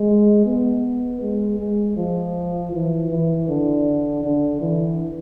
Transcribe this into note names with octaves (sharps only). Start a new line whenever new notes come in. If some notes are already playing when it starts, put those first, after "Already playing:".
Already playing: G#3
B3
G#3
G#3
F3
E3
E3
D3
D3
E3